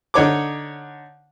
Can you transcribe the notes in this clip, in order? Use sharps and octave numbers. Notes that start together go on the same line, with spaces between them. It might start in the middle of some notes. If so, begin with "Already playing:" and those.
D3 D#4 C#5 D6